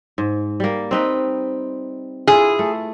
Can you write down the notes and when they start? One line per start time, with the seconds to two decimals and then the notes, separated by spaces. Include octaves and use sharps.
0.18 G#2
0.60 G3 A#3
0.91 C4 D#4 B4
2.27 E4 F4 G#4 B4
2.59 A3